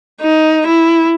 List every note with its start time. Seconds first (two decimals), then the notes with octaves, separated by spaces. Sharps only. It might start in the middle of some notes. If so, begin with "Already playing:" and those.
0.22 D#4
0.67 E4